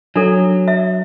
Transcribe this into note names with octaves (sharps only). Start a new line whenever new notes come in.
F#3 D4 A4
E5